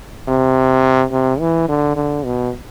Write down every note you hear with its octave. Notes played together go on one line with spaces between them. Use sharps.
C3
C3
E3
D3
D3
B2